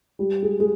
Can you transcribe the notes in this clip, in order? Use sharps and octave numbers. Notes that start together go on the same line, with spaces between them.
G3
G#3
G#3